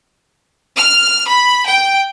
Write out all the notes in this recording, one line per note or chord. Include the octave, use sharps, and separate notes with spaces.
F6
B5
G5